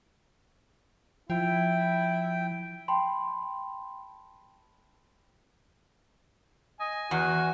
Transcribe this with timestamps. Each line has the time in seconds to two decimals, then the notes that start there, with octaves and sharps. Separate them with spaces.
1.30 F3 E4 G5
2.88 G5 A5 B5 C6
6.80 D#5 G#5
7.11 E2 F#4 F#5